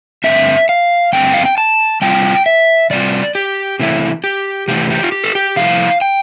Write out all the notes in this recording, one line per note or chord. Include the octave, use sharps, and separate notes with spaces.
G2 D3 A3 C4 E5
F5
G2 D3 A3 C4 G5
F5
G5
A5
C3 G3 C4 F4 G5
E5
C3 G3 C4 F4 D5
G4
C3 E3 A3 E4
G4
C3 E3 A3 E4 G4
G4
F4
G4
A4
G4
C3 F3 A3 E4 F5
G5